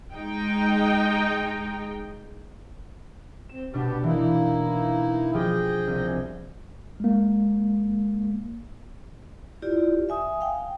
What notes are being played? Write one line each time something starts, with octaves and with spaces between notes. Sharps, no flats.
G#3 D#4 G5
C4 E7
B2 B3 D4 G4
E3 A#3 D#4 E4
F3 G4 G#4 D#5 G5
C2
G#3 A#3
E4 F4 G4 D5
E5 G#5 D#6
F5 G5